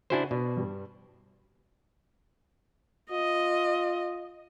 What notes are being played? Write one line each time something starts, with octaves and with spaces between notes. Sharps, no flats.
C#3 D4 E4 F#4 C5 G#5
B2 D4
G2 G3
F4 D#5